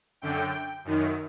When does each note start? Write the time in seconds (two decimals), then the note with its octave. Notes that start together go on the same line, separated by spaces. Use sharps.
0.22 F#2 D3 G5
0.85 F#2 D#3